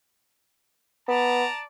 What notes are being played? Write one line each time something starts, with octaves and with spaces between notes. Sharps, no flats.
B3 D5 A5 A#5